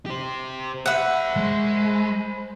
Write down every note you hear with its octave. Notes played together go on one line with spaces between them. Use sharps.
G4 C5
C5 E5 F#5 B5
G#3